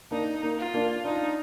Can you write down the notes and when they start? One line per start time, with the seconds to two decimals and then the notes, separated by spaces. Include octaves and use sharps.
0.11 A#3 D4 D#4
0.43 A#3
0.58 F4
0.74 A#3 D4
1.05 D4 D#4 F4